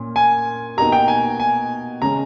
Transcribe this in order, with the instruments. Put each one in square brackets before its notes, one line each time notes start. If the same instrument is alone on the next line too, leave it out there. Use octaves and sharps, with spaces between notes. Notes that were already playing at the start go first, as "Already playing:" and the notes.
Already playing: [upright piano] A#2 C#4
[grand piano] G#5
[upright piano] B2 A#3 D#4 G4 [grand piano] A#5
[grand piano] G5
G#5
G#5
[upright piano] C#3 G#3 C#4 G#4 [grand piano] A#5